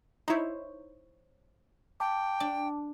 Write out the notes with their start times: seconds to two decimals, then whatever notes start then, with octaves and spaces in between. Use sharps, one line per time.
0.28 D#4 E4 C5 C#5
2.00 G5 A5 D6
2.40 D4